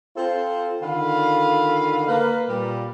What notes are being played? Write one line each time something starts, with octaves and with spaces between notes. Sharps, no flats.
C4 F4 A4 C5
D3 D#3 F4 F5 B5
A#3 B4
A#2 G3